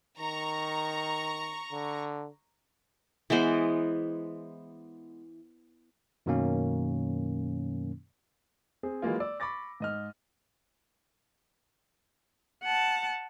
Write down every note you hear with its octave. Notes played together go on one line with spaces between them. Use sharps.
D#3 A#5 C#6
D3
E3 G#3 B3 C5
F#2 B2 D#3 F#3 A#3 C#4
C4 G#4
E3 F#3 G#3 A#3 F4
D5 E6
B5 C#6 D6 A6 A#6
G#2 D#5 F6
F#5 A5